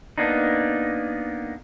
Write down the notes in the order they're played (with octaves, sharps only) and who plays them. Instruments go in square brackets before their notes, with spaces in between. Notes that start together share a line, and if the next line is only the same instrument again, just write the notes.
[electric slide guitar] A#3 B3 D4 D#4